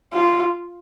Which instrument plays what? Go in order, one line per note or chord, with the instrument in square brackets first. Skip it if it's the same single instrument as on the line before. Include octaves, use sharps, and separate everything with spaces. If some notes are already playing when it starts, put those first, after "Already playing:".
[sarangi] F4